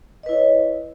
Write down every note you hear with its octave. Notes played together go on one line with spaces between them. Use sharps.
E4 B4 C#5 D#5